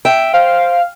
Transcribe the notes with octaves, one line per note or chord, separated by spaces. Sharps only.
E5 G5
C5 F5